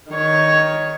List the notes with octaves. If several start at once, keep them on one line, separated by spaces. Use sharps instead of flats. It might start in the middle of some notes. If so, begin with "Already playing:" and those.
D#3 C#5